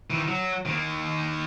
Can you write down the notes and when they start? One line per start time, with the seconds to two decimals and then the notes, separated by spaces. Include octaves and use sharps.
0.10 D#3 E3
0.28 F#3
0.66 D#3 A#3